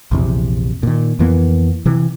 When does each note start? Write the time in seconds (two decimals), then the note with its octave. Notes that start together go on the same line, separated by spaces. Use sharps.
0.11 A#1 E2 C3
0.83 A#2 D#3
1.19 F2 E3 A#3 B3
1.86 C3 E3